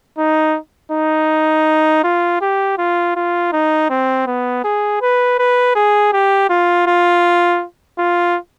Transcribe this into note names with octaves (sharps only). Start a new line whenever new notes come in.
D#4
D#4
F4
G4
F4
F4
D#4
C4
B3
G#4
B4
B4
G#4
G4
F4
F4
F4